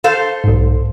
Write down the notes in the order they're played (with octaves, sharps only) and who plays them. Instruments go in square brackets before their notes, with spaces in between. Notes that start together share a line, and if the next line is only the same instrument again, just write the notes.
[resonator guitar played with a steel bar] A4 C5 F5
[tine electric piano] B1 G#2